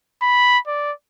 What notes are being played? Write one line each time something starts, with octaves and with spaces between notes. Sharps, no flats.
B5
D5